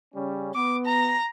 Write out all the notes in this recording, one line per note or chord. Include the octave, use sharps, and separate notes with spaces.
C#3 G3 C#4
B3 D6
A#5